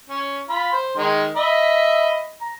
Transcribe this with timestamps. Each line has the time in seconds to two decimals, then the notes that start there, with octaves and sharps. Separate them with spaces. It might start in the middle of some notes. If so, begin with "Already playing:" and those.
0.10 C#4
0.49 F4 B5
0.73 C5
0.97 D#3 G#3
1.36 D#5 E5 B5
2.41 A#5